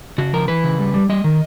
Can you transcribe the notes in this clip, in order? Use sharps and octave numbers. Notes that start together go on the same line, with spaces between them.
C#3 F#4
F3 A#4
E3 B4
C#3
G3
G3
G3 D#5
D#3